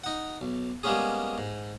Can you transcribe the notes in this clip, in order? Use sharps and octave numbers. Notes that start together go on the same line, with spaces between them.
D#4 F#5
B1
G3 G#3 A#3 B3 C#4 G#4
G#2